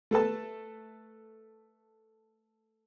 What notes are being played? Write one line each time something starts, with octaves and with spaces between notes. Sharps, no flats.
A3 A4 B4 A5